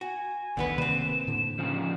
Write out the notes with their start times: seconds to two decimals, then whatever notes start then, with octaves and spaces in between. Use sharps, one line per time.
0.01 F#4 G#5
0.57 F#1 D2 D3 D#3 B3 B4
0.78 C3 D#3 A#3 C4 B4 E7
1.27 A2 D3 A#3
1.59 C#3 F3